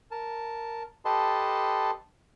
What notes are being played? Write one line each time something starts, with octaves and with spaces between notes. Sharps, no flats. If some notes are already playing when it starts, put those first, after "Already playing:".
A#4 A5
G4 A4 B4 D#5 A5 C6